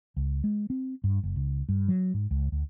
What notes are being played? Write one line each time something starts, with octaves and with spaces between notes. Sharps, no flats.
C#2
G#3
C4
G2
F#1
C#2
G2
F#3
G#2
C#2
D2